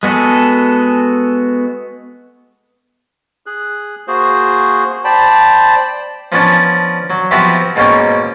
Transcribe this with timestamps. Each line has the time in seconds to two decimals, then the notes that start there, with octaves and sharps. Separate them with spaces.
0.03 G#3 B3 F#4 G#4 A4
3.46 G#4 F#6
4.08 A#3 F#4 G#4 C5
5.04 C5 D5 G5 A5 B5
6.32 F3 B3 C#4 D4
7.10 F#3
7.31 F3 B3 C4 F#4 G4 E5
7.76 G#2 B2 A#3 C#4 G5